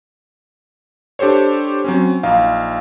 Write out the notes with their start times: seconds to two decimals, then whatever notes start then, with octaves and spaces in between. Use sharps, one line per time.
1.19 D4 G4 A4 C5 C#5
1.84 F#3 C4 C#4
2.23 A#1 D#4 F5